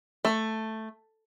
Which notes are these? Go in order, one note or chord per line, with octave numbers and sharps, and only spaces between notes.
A3